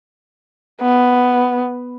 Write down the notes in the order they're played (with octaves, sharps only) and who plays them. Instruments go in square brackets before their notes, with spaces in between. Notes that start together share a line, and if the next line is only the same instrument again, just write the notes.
[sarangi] B3